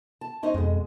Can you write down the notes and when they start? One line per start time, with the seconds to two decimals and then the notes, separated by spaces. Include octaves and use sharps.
0.21 A5
0.43 C#4 D#4 C5
0.54 F2 B2 G#3